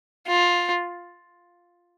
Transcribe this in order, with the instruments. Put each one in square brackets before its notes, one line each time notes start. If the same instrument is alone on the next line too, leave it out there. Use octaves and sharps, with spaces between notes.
[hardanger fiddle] F4